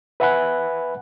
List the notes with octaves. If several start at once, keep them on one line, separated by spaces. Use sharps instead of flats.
B4 E5 F#5 G#5 B5 F#6